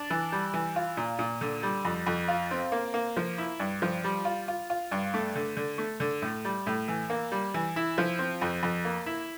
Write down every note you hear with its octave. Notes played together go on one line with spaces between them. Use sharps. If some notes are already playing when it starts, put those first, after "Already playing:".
Already playing: D4
E3
G3
E3
F4
A#2
A#2
D3
G3
F2
F2
F4
C4
A#3
A#3
F3
E4
G2
F3
G3
F4
F4
F4
G2
A3
D3
D3
A3
D3
A2
G3
A2
E3
A#3
G3
E3
E4
F3
C4
F2
F2
A#3
E4